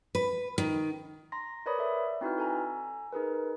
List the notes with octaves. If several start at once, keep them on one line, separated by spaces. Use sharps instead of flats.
B4
D#3
A#5 C6 A#6
A#4 B4 C#5 D5 B5 D#6
A4 D5 E5
C4 D#4 E4 F#4 B4 F6
A4 G#5 A#5
D#4 G#4 A#4 B4